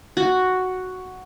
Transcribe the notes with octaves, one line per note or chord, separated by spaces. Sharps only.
F#4